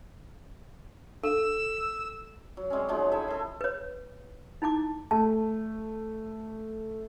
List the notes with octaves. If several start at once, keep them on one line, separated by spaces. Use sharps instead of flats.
A4 E6
F#3
G3 G#3 C4 C#4
F3 F#3 G#3 D#4
E4 G#4 A4 E5
A4 C6
B4 C#5
D#4 E4 A5 D6
A3 A5